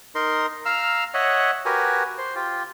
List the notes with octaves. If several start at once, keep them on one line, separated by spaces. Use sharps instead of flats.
D#4 A#4 C6
F5 A#5 E6 F6
C#5 D#5 E5 F#5
F#4 G4 A#4 B4 G#5
C5
F4 G4